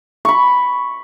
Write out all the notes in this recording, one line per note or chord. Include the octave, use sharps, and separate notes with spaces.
B5 C#6